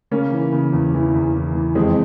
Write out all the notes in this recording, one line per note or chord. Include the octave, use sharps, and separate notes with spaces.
C#3 A#3 C#4
E3
C#3
E2
E3
E2
E3
E3
F2 G#3 C4